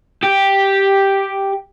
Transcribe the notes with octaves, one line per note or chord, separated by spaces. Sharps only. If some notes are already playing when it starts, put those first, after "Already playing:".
G4